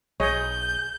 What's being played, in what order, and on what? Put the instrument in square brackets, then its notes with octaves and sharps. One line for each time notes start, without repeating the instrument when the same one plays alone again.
[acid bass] B1 [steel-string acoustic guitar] G#4 [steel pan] C#5 D#5 [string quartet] G6